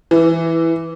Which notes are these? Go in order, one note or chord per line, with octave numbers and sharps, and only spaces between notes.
E3